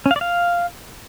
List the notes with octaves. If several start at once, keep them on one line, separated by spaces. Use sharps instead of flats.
C#4
F5
D5
F5